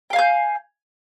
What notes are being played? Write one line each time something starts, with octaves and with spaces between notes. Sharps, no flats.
F5 G5 G#5 G6